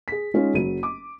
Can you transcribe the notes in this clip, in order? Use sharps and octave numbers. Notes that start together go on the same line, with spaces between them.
G#4 B6
G#3 C#4 D#4 F4
F#1 F#3 D#7
D6